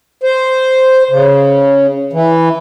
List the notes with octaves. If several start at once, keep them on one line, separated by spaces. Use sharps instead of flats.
C5
C#3
E3